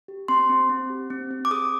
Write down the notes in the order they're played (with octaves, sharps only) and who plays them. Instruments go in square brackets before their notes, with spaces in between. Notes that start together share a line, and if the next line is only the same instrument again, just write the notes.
[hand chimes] G4
C4 C6
C4
C4
G4
C4
C4
D6
G#4 D#6